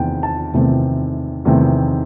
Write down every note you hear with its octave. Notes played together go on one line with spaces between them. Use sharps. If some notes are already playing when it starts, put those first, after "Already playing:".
Already playing: E2 C3 D#3 A3 C4 G5
A5
E2 C3 D#3 A3 C4
E2 C3 D#3 A3 C4